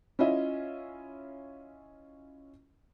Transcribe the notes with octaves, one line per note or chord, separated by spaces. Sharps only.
C#4 E4 F4 D#5 E5